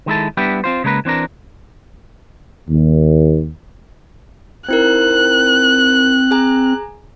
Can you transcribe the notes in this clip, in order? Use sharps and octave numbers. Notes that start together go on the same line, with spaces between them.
D#3 G#3 E4 A4
G3 B3 D4 E4 G4
C4 F4 C5
C#3 G#3 A#3 A#4 B4
E3 C4 D4 A#4
D#2
C4 D#4 E4 A#4 F#6
G#4 G#5 A#5